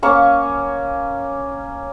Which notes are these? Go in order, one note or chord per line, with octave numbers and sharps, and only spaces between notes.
A#3 C#4 C#6